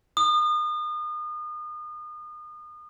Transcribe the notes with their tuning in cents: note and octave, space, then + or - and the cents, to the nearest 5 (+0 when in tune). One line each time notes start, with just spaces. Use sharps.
D#6 -35